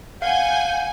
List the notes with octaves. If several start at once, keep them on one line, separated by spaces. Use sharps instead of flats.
F5 F#5 G#5 G6